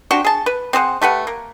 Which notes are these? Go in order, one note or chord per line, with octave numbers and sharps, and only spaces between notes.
C4 D4 F#4 G4
G#4 A5
B4
C4 G#4 C5 F#5
A3 G4 B4 F#5
A#3